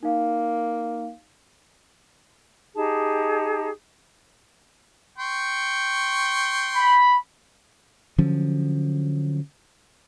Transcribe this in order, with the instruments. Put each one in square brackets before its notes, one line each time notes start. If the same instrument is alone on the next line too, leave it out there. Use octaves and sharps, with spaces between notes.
[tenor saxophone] A#3 [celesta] D#4 F5
[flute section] D#4 G4 G#4 A5
[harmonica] G5 C6 C#6
[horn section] B5
[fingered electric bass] D3 F3 F#3 C#4